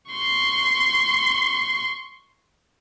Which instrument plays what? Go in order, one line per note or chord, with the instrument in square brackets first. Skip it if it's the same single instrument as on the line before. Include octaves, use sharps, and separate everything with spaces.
[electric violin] C6 C#6